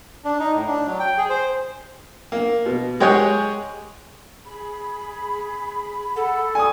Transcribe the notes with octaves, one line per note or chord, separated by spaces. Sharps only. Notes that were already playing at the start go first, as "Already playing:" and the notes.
D4
D#4
A2
D4
F#3
G5
G#4
C5
A#3
B2
G#3 G4 G#4 C#5 D#5 F#5
G#4 B5
A4 F#5
D5 G#5 C#6 D#6